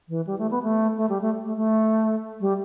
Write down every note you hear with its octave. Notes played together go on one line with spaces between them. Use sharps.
E3
G3
A3
B3
A3
A3
G3
A3
A3
A3
G3